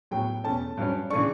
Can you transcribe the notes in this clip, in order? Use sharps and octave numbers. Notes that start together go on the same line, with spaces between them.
A2 F#3 B3 G5
E2 B2 A3 C#4 A5
G2 F#3 C#4
C#3 E3 A3 D4 C#6